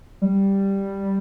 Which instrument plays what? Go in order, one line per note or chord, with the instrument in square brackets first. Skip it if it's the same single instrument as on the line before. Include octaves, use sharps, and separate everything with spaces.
[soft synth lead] G3